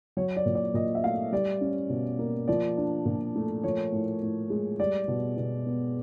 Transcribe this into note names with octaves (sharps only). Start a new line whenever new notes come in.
F#3 C#5
D5
A#2
D5
A#2 D#5
E5
A3 F5
G3 D5
C#4
B2
A#3
F3 D5
D4
A#2
A3
F3 C#5
A2
A2
G#3
G3 D5
B2
B2
B3